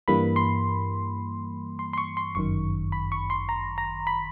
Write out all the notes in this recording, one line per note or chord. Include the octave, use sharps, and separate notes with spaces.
G2 E3 G3 A#3 B5
C6
C6
C6
C#6
C6
G1 F#2 D#3 C#6
B5
C#6
C6
A#5
A#5
B5